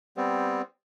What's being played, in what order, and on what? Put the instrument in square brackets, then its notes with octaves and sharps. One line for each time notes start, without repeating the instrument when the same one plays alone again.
[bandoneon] G3 B3 C4